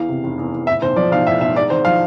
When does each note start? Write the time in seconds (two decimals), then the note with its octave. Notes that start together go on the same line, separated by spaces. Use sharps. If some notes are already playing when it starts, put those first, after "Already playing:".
Already playing: E2 E3 F5
0.09 C3
0.24 F1
0.38 E2
0.54 E3
0.67 A2 E5
0.82 B1 C5
0.96 F3 D5
1.11 B1 F5
1.27 A2 E5
1.41 B1 E5
1.56 G#2 D5
1.70 G#1 C5
1.85 F3 F5